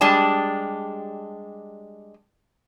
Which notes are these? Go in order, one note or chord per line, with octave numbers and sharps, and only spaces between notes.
G3 G#3 D4 G4 A5